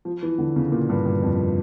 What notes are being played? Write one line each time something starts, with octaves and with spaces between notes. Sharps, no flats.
F3
E3
D3
C#3
A#2
G2
G2
F2